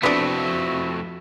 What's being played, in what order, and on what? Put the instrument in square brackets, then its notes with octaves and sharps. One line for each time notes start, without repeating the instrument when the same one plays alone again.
[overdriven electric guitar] F2 A3 [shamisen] B3 D4 [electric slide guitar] C4 E4 B4 [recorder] F#4